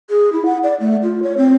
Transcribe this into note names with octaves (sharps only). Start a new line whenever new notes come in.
G#4
E4
F#5
D5
A3
F4
C#5
C4